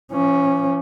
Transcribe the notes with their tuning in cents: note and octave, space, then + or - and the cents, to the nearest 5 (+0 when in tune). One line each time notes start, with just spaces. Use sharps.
F3 -40 C#4 +0